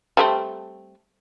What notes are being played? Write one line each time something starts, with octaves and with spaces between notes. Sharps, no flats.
G3 A3 C4